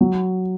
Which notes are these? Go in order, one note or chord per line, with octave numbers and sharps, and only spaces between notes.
F#3